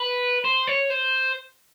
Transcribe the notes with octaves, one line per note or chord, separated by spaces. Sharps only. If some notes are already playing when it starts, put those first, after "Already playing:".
Already playing: B4
C5
C#5
C5